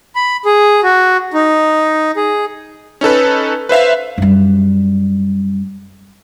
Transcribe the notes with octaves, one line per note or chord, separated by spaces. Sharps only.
B5
G#4
F#4
D#4
G#4
C#4 D#4 A4 B4
B4 C5 E5 F5
F#2 G3